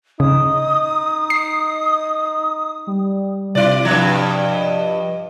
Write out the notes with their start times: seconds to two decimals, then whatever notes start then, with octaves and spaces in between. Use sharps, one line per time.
0.20 C#3 D#4 D#6
1.30 C7
2.87 G3
3.55 C3 E4 D5
3.85 G2 F3
4.45 D#5